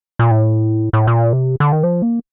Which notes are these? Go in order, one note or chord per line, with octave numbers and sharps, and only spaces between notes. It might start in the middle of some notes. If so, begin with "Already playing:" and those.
A#2
A2
A2
A#2
C3
D3
D#3
F3
A#3